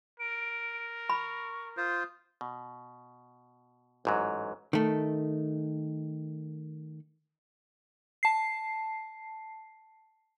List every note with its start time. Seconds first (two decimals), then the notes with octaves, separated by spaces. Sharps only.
0.20 A#4 D7
1.10 B5 C#6
1.77 F4 C5 D#6
2.41 B2
4.05 A1 G#2 F#3
4.73 D#3 A3
8.23 A5 C7